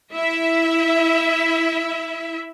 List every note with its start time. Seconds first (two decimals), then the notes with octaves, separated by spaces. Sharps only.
0.15 E4 E5